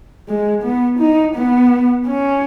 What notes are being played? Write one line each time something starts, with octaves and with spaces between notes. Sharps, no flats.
G#3
B3
D#4
B3
C#4